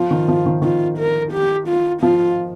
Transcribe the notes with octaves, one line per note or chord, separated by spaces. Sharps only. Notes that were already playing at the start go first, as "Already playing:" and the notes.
Already playing: F3 F4
D#3
F3
D#3
D#3 F4
A#4
G4
F4
F3 F4